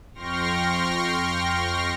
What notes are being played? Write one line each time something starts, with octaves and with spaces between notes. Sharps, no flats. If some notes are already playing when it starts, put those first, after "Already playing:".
F2 G5 C6 C#6 F6 A#6